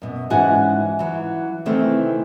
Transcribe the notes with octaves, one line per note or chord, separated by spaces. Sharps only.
F#2 B2
G#2 E3 C#4 D#4 F#4 G#5
E3 F#3
C3 D#3 E3 A3 C4